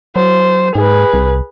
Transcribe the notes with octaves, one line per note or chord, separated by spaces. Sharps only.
F#3 C5
G#2 G#4 B4
C2